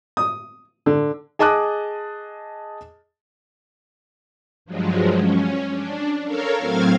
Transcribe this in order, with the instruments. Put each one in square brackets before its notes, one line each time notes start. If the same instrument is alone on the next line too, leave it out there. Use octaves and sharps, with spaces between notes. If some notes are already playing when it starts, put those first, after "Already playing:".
[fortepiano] D#6
D3
[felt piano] G#4 D#5 A5 D6 D#6 F#6
[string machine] G2 F3 F#3 G#3
C#4
D4
A4 A#4 C#5 F5 A#5
A2 F#3 C4 F5 F6 G#6